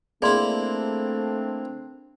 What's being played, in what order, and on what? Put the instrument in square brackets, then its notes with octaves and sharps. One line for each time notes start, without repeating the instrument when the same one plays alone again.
[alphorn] A3 [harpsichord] A#3 E4 [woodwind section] C4 D4 [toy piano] G#4 D5 C6